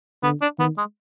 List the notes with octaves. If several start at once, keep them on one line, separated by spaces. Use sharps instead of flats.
D3 B3
D4
D#3 B3
G#3